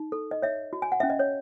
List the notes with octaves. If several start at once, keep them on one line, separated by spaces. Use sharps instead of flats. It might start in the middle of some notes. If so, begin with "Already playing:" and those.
Already playing: D#4
A4
D#5
C#5 E5
F#4
G#5
F#5
C#4 E5
D#5
C#5